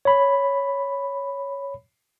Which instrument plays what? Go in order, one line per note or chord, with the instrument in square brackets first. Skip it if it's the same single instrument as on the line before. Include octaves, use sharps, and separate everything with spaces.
[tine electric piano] C#5 B5